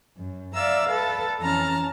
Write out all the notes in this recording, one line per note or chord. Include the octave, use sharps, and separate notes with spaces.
F#2
D5 E5 F5 A#5 E6
A4 B4 A6
F2 E3 C#4 A5 A#5 F6